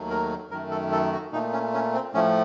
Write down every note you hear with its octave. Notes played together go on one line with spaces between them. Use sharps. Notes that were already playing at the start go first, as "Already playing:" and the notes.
Already playing: D#2 D#3 F#3 A3
A#4
F#2 D#3 A3 A#4
A4
A4
F#4
A#2 A3 D#4
C#4
C#4
C4
A2 F3 A3 C#4